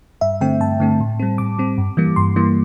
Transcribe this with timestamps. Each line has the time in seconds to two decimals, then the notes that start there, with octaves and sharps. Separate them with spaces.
0.21 G2 E5
0.41 D3 A3 C4 G5
0.60 G2 A5
0.80 D3 A3 C4
1.00 A2
1.20 G3 C4
1.38 A2 D6
1.58 G3 C4
1.78 G2
1.97 E3 G3 A#3
2.16 G2 C6
2.36 E3 G3 A#3